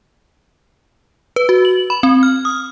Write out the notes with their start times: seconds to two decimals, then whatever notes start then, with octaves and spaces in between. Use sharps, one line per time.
1.36 B4
1.49 F#4
1.65 F#7
1.90 B5
2.03 C4
2.23 F6
2.45 D#6